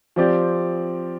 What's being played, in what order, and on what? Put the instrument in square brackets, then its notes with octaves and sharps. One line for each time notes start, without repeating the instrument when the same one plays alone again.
[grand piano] F3 C4 G4 D5